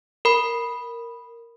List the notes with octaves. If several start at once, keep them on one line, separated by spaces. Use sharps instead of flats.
A#4 B5